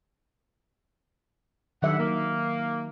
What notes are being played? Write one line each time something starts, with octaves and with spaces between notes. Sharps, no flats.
G2 D3 D#3 F#3 E5 F#5
A#3